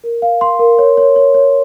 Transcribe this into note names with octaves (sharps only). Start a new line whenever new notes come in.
A#4
F5
C6
A#4
C#5
C#5
C#5
C#5